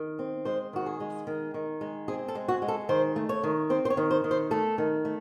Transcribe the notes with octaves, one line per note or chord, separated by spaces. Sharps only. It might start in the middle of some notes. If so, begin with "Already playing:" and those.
Already playing: D#3
C4
G#3 C5
D#3 F#4
G#4
G#3
D#3
D#3
G#3
C4 G#4
A4
G#3
F#4
G#3
A4
D#3 C5
A3
C#5
D#3
C4 C5
C5
C#5
D#3
C5
D#3
C5
A3 A4
D#3
A3